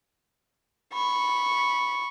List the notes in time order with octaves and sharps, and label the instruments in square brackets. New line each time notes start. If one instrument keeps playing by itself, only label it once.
[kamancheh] B5 C#6